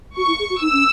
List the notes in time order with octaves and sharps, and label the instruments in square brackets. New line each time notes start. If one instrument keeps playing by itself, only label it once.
[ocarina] F#4 [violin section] C#6
[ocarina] E4
G#4
F#4
[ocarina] D#4 [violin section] E6
[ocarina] C#4